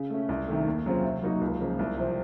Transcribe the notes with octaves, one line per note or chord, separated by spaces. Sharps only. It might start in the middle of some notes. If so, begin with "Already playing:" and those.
Already playing: C#3
A3 C#4
C2
C3 D#3 A3
D#2
C#3 F#3 C4 F4
C3
F#3 A#3 D#4 F#4
C#2
C#3 F3 A#3
C2
C3 F3 C4